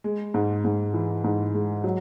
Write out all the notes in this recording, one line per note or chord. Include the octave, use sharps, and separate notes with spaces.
G#3
G#2
G#2
E3
G#2
G#3
F#3